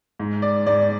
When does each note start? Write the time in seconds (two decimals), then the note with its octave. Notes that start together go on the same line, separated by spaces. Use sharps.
0.20 G#2
0.42 D5
0.66 G#2 D5